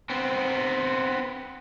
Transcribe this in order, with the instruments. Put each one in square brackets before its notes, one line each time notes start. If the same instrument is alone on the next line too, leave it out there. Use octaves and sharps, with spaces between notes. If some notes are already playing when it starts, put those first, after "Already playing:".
[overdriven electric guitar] B3 C4